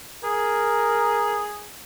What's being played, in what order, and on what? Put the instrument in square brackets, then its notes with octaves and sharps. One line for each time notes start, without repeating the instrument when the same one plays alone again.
[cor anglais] G#4 [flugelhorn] A#4